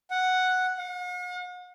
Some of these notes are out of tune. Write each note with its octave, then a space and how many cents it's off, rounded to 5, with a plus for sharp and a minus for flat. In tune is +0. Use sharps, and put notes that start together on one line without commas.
F#5 +0
F#5 -45